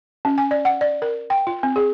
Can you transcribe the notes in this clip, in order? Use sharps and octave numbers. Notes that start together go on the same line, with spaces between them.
C#4
G#5
D5
F#5
D5
A#4
G5
F4
C4
G#4